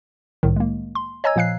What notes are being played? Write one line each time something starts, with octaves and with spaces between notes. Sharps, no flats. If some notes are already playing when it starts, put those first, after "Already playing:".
C2 A2 D#3
G#3 A#3
C6
C#5 D#5 G#5 A#5 E6 G#6
A#2 F3 F5 F#6 C7